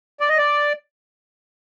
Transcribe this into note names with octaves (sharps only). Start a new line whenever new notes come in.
D5
D#5
D5